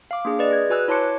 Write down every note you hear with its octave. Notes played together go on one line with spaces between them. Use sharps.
F5 D6
A#3 D4 G#4
B4 D5 D#5
G#4 G#6
F#4 B4 G#5 E6 F#6
E4 C#5 A5 C6 D6 C#7